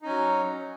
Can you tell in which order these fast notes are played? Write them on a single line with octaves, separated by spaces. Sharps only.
D#4 C#4 F#3